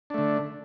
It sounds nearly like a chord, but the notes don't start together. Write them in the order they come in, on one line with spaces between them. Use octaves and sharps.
D4 A3 D3